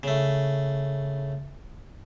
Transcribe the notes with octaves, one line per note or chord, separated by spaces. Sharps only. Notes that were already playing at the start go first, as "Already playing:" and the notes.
C#3 A3